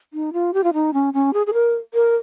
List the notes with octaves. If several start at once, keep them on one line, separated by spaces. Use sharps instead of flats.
D#4
F4
G4
F4
D#4
C#4
C#4
G#4
G#4
A#4
A#4